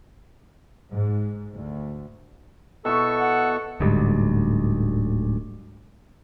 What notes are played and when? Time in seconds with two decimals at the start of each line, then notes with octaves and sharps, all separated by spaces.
0.91 G#2
1.54 D2
2.85 B2 E4 A4 C#6 E6
3.20 F#5
3.80 D1 D2 G#2 G3